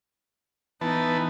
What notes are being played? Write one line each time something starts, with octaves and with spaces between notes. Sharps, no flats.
E3 B3 D#4 B4 A5